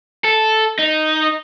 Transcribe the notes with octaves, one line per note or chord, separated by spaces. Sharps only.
A4
D#4